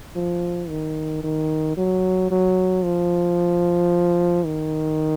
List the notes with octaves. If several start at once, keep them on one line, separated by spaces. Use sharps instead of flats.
F3
D#3
D#3
F#3
F#3
F3
D#3